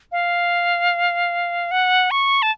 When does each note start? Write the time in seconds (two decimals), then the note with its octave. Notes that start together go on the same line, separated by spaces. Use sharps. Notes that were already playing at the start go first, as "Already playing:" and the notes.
0.12 F5
1.71 F#5
2.11 C#6
2.42 A5